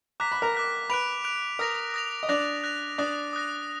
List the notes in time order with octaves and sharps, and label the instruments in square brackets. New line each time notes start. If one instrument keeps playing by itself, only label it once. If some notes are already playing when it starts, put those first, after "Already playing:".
[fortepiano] A#5 [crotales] D6 F#6 B6
[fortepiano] B5
A#4 A#5
[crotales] D6 F#6 B6
[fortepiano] B4 B5 [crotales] F#6 D7 F7
[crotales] F#6 D7 F7
[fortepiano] A#4 A#5 [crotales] D#6 A#6 F7
[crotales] D#6 A#6 F7
[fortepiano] D#5
[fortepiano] D4 D5 [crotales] F#6 A#6 F7
[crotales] F#6 A#6 F7
[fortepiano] D4 D5 [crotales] D#6 F#6 A#6
[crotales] D#6 F#6 A#6